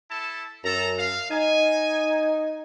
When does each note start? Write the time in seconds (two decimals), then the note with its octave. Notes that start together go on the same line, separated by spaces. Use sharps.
0.11 E4 A4 A5
0.64 F#2 A4 A5 A#5
0.98 F5
1.31 D#4 G#5